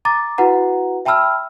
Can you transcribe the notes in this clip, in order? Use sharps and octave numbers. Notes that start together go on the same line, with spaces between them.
A#5 D6 A6
E4 F#4 B4 F#5 A#5
E5 G5 A5 B5 E6 F6